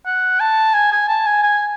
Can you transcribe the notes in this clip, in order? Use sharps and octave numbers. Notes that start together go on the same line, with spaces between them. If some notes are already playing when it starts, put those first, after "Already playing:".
F#5
A5
G#5
G#5
A5
G#5
G#5